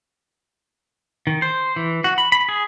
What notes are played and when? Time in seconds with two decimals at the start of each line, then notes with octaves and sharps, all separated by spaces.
1.27 D#3
1.42 C5
1.76 E3
2.04 F#4
2.18 B5
2.32 B5
2.49 G#4